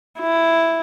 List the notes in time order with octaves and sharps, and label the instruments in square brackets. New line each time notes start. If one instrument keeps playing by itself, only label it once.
[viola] E4